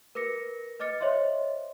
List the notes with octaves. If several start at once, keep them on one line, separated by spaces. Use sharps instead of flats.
A#4 B4 D6 A#6 C#7
B4 D#5 D6 F6 A6 C#7
C5 C#5 D#5 E5 C6